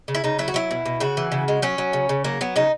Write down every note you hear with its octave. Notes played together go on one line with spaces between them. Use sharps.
C#3
E4
C#3 D#4
F#3 E4
F#4
F#3 E4
B2
B2
C#3 F#4
E3
C#3
G#3
F#3 C#4
F#3
C#3
C#3
F#3 A#3
F#3 B3
C#3 D#4